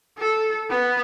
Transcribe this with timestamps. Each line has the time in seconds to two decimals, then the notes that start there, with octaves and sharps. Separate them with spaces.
0.18 A4
0.70 B3